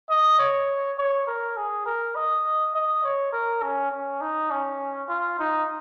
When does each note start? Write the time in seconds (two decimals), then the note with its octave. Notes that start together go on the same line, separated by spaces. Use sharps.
0.10 D#5
0.39 C#5
0.98 C#5
1.27 A#4
1.57 G#4
1.86 A#4
2.16 D#5
2.75 D#5
3.04 C#5
3.33 A#4
3.62 C#4
3.92 C#4
4.21 D#4
4.51 C#4
5.09 F4
5.39 D#4